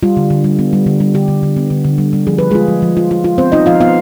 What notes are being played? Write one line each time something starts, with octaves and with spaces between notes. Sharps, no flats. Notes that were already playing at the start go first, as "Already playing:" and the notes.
G3 F4
D3
D3
G3
B3
G3
D3
G3
D3 G4
D3
D3
B3
D3
D3
G3
G3
F3 G#4
F3 B4
G#3 F4 G#4
F3
F3
F4
F4
F4
B3 C4 C5
D#4 F4 D#5
F3 F4 F5
B3 F4 F5